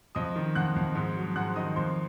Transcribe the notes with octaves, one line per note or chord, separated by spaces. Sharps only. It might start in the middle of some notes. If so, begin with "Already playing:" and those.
F2 D#5 D#6
D#3
F2 F#5 F#6
F2
G#2
F#3
G#2 F#5 F#6
D#3 D#5 D#6
F2 C5 C6